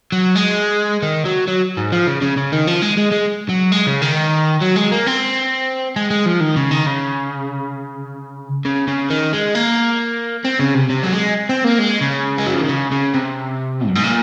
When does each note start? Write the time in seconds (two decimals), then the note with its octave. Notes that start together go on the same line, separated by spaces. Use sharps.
0.12 F#3
0.35 G#3
1.02 D#3
1.25 F#3
1.47 F#3
1.77 G#2
1.92 F3
2.07 C#3
2.22 C#3
2.37 C#3
2.52 D#3
2.67 F3
2.82 G#3
2.97 G#3
3.11 G#3
3.49 F#3
3.72 G#3
3.87 C#3
4.01 D#3
4.61 F#3
4.76 G#3
4.91 A#3
5.06 C4
5.96 G#3
6.11 G#3
6.26 F3
6.41 D#3
6.56 C#3
6.71 D#3
6.86 C#3
8.65 C#3
8.88 C#3
9.10 D#3
9.33 G#3
9.55 A#3
10.45 C4
10.59 C#3
10.75 C3
10.90 C3
11.03 F#3
11.12 G#3
11.49 C4
11.64 A#3
11.79 G#3
12.01 C#3
12.38 G#3
12.47 F#3
12.54 F3
12.61 D#3
12.69 C#3
12.91 C#3
13.14 C3
13.88 F#2
13.96 G#2
14.04 A#2